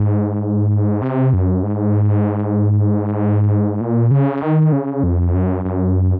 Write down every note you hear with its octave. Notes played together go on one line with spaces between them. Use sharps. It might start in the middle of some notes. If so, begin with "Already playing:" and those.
Already playing: G#2
C3
F#2
G#2
A#2
C#3
D#3
C#3
F2
F#2
F#2